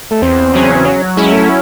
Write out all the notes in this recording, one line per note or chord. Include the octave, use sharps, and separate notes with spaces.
A3
E2 C4
C#3 F#3 C#4 G#4
C4
F#3 C#4
G#3 C#4 E4
A3